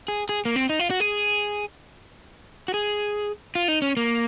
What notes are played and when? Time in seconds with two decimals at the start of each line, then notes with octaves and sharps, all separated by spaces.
0.08 G#4
0.29 G#4
0.45 A#3
0.56 C4
0.69 D#4
0.79 F4
0.90 F#4
1.00 G#4
2.68 F#4
2.74 G#4
3.55 F4
3.68 D#4
3.82 C#4
3.97 A#3